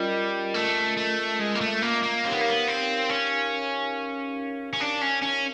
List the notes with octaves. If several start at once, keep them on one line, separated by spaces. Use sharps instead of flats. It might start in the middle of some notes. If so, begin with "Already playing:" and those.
Already playing: G3 C#4 F4 A#4 D#5
A3
A3
G#3
A#3
A3
A#3
A#3
C4 D#4 G4 A#4 C#5 F5
B3
A#3
B3
C4
C#4
C#4
D4
C#4
C#4